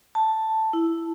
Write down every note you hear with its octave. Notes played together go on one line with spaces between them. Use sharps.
A5
E4